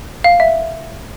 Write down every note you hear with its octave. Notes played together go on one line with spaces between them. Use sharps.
F5
E5